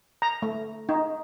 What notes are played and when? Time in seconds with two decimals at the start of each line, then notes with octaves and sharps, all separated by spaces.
0.22 A#5
0.42 A3
0.89 D#4